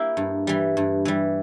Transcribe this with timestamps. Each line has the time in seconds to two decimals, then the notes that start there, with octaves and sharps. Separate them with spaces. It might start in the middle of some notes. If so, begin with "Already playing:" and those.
Already playing: A#3 E4 G4
0.17 G2
0.47 E3 G3
0.77 G2
1.05 E3 G3